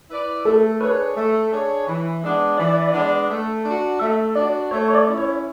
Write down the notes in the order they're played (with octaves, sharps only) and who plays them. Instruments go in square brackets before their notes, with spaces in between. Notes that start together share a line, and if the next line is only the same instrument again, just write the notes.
[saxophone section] E4 B4 D5
[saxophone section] A3 [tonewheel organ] A4
[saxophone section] D4 G#4 C#5 [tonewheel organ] B4
[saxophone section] A3
D4 G#4 C#5
E3
G#3 B3 D4
[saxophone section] E3 [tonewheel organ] D5
[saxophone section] G#3 B3 D4
A3
D4 F#4
[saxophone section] A3 [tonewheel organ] E5
[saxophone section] D4 F#4 [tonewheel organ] D5
[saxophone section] A3 [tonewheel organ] C#5
[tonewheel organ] C#5
D5
[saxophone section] C#4 E4
[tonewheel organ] C#5